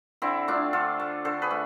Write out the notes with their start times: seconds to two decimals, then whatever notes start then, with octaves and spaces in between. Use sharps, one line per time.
0.22 D3 C4 E4
0.48 A3 D4 F4
0.73 D3 F4 A4
1.00 A3
1.25 D3 A4 C5
1.42 G#4 B4
1.51 A3